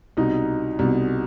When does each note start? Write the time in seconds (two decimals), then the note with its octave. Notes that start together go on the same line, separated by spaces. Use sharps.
0.17 C2 B2 D#4
0.79 C2 B2